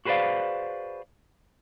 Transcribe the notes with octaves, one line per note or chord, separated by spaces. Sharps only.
F#4 G#4 B4 C5 D5 F5